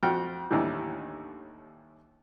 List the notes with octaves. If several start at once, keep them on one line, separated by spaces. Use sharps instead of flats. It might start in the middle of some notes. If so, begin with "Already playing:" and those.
F2 F#4 G5 F6
D#2 A2 D3 E3 G3